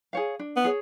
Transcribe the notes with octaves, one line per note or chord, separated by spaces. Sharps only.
G#4 C#5 F5
D4
B3
G#4 C#5